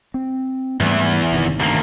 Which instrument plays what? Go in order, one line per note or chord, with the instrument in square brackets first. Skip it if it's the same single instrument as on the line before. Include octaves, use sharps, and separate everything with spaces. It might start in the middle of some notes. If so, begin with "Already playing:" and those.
[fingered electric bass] C4
[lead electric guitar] E2 E3 [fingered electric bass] G#2 G3 A3
[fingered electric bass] G1 C3 D#3
[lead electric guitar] D2 A#3